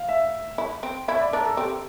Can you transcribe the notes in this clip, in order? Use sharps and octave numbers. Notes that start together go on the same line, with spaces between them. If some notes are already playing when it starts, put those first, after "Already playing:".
Already playing: F5
E5
E4
C4
E4 E5
D5
D4 A#4
A4
C4 G4